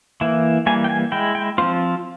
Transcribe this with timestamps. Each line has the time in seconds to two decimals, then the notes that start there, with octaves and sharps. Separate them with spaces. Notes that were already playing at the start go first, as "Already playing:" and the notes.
0.21 E3 A#3 E4
0.66 E3 G3 A#3 G#5
0.84 G5
0.90 G#5
1.12 G#3 E4 G5
1.35 G5
1.58 F3 C4 F4 C5